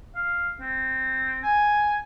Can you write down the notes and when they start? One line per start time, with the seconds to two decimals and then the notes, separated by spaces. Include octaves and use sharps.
0.15 F5
0.61 C4
1.43 G#5